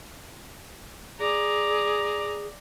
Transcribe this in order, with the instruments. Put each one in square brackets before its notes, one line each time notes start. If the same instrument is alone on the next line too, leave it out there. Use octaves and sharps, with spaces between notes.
[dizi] G#4 [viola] D5 A#5